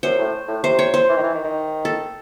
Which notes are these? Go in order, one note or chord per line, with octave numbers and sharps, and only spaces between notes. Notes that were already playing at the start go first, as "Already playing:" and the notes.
F#2 C5
A2
A2
C3 C5
C#5
C5
E3
D#3
E3
D#3
D#3
A4